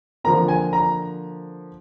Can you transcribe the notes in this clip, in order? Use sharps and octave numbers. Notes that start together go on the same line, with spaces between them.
D3 F3 A#3 A#5
G#5
A#5